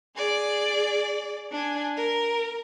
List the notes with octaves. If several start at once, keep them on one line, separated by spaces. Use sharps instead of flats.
G#4 D5
D4 G#5
A#4